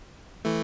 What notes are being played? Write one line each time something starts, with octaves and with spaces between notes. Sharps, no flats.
E3 A3